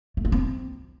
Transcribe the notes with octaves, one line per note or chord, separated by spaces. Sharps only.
A3
F4
C4